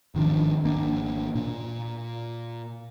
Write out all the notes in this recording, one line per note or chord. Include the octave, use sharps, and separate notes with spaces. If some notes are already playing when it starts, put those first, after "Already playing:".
G#1 D#3 F3 D4
G#1 A#3 D4
A#2